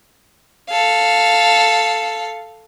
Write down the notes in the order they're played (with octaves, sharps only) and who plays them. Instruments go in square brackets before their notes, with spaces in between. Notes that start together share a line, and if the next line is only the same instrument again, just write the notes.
[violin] A4 F5